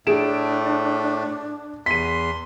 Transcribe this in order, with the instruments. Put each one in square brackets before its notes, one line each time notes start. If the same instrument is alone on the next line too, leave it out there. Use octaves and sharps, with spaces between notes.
[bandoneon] A2 A3 [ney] D4 [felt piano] G#4 D7 E7
[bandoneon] E2 C6 [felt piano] B6 D#7